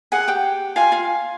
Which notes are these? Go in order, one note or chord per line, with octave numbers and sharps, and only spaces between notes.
G#4 F#5 G#5
G4 G5
F4 F5 G#5
F4 F5